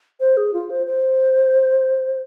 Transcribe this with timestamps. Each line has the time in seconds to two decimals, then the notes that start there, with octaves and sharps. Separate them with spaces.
0.20 C5
0.37 G#4
0.53 F4
0.70 C5
0.87 C5